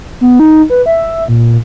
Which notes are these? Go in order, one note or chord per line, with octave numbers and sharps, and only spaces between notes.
B3
D#4
B4
E5
A#2